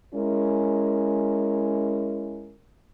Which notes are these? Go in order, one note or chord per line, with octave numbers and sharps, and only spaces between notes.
G#3 C#4 E4 A#4